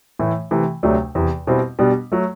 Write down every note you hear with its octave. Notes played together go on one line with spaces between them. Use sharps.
A2 E3 A3
C3 E3 A3
D2 C3 F#3 A3 D4
E2 C3 E3
B2 G3 C4 E4
B2 G3 B3 D4
F#3 A3